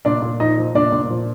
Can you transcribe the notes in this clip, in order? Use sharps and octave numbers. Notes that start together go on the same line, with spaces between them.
A#2 D4 D5
A#2
F3 D#4 D#5
F3
A#2 D4 D5
A#2
F3